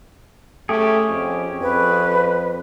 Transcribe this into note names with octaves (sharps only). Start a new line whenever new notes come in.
A3 C#4 G4 G#4
F2
F2 B4